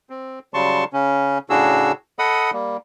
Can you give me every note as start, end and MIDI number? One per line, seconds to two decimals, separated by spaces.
0.10 0.39 60
0.54 0.84 49
0.54 0.84 54
0.54 0.84 55
0.54 0.84 81
0.54 0.84 84
0.54 0.84 85
0.93 1.38 49
0.93 1.38 61
1.50 1.92 45
1.50 1.92 49
1.50 1.92 62
1.50 1.92 66
1.50 1.92 68
1.50 1.92 88
2.19 2.51 69
2.19 2.51 75
2.19 2.51 78
2.19 2.51 83
2.19 2.51 87
2.53 2.77 55
2.53 2.77 58